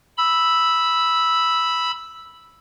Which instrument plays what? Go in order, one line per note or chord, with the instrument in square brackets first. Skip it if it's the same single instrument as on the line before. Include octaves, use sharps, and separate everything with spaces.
[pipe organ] B5 E6